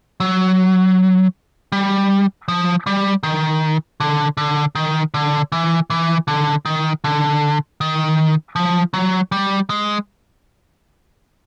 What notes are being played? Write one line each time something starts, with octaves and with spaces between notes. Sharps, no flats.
F#3
G3
F3
G3
D#3
D3
D3
D#3
D3
E3
E3
D3
D#3
D3
D#3
F3
F#3
G3
G#3